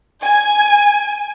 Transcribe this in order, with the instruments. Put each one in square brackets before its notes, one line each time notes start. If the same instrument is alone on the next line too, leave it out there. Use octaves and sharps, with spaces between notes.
[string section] G#5